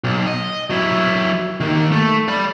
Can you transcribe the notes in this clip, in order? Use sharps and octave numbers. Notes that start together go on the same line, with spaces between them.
B1
D#5
F#3 E4
D#3 A#3
A3
D5 B5